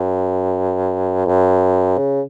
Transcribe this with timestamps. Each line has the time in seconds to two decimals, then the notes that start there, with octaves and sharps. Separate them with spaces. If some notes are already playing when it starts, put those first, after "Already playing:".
Already playing: F#2
1.25 F2
1.29 F#2
1.98 C#3